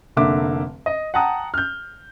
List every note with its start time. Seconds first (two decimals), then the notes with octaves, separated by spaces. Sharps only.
0.16 F1 D3 A#3 E5 D6
0.86 D#5
1.14 F#5 G5 A5 A#5 D#6
1.54 F6 G6